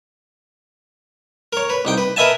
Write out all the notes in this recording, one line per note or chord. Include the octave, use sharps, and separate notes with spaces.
A#4 C#5
B4
C2 D#4 G5
B4
A#4 B4 D#5 E5 G#5 A5